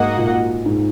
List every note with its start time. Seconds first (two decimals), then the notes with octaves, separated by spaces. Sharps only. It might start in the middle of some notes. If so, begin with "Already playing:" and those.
Already playing: G#2 A#3 F#4 D#5 F#5
0.17 A#2
0.66 G#2